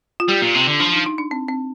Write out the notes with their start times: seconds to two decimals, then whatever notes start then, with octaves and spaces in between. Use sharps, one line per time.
0.20 F4
0.28 G3 G4
0.42 A#2
0.54 C3
0.67 D3
0.80 F3 D4
0.93 D#4
1.06 D#4
1.18 D4
1.31 C4
1.48 C4